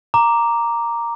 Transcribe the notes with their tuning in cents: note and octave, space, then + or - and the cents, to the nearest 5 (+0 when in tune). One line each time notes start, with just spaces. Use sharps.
A#5 +0 D6 +0